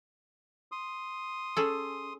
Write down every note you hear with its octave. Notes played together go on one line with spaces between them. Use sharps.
C6 D#6
C#4 G#4 A4